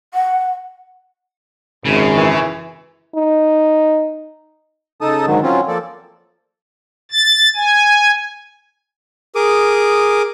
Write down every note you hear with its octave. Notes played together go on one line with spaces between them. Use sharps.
F#5
G#1 F#2 C#3
E3
D#4
C#3 D#4 A4 A5 D#6
G#2 D3 D#3 F#3
F#3 C4 C#4 F4
F3 A#3 A4 D5
A6
G#5
G#4 A#4 D6 D#6